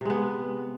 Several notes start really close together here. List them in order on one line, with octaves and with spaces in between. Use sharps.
C3 G#3 B3